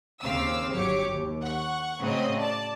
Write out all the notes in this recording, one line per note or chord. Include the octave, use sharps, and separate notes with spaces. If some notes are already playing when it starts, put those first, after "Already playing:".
D#2 C#3 C4 F5 D6 E6
G1 F#3 G4 C#5 D6 C#7
D#2
F#5 C#6
A2 C#3 F#3 C4 D#5
D5 A5